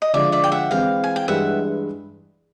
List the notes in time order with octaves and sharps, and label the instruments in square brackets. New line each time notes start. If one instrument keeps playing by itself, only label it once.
[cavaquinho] D#5
[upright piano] D3 F3 G#3 [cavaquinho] D5 E5
[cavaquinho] D5 E5
G5
E5 F#5
[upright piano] E3 G#3 C4 E4 [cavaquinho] F5 G5
[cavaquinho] G#5
G5
[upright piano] G2 E3 G#3 [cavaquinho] E5 F#5